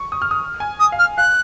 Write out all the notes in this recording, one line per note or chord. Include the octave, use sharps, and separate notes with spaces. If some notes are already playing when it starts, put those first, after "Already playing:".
Already playing: C#6
D#6
F6
D#6
G#5
D#6
F5
F6
F5 F#6